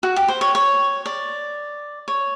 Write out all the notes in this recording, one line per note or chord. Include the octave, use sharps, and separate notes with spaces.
F#4
G4
C5
C#5
C#5
D5
C#5